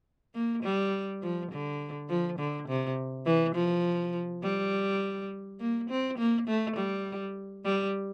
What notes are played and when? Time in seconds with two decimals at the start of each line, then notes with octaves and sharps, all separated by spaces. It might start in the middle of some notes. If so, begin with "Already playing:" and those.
0.35 A#3
0.63 G3
1.22 F3
1.52 D3
2.09 F3
2.39 D3
2.68 C3
3.26 E3
3.55 F3
4.43 G3
5.60 A#3
5.90 C4
6.18 A#3
6.47 A3
6.76 G3
7.65 G3